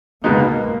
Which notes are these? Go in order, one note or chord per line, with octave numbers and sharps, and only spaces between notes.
C#2 B2 G#3 A#3 B3 D#4